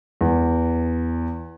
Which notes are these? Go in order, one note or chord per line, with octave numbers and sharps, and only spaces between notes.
E2